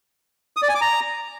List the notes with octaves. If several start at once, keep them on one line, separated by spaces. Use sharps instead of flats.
D#6
D5
G#5
D6
A#5